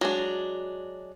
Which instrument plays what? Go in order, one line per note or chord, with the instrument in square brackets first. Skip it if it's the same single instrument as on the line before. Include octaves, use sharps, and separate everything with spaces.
[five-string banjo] F#3 G#3 D4